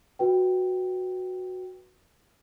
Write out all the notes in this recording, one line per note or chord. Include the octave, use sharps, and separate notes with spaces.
F#4 B4 G5